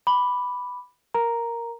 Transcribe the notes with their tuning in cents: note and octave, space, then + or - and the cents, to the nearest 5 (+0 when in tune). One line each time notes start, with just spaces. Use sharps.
B5 +0 D6 +0
A#4 +0 A#5 +0